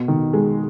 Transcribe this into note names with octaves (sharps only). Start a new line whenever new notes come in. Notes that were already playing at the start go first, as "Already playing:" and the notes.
Already playing: B2
D#3
G#3